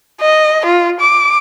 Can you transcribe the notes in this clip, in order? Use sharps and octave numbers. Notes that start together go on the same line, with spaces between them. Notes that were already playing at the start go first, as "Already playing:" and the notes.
D#5
F4
D6